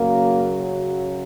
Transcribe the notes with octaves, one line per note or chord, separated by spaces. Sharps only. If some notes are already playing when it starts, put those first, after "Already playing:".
Already playing: F#2 C#3 F#3 A#3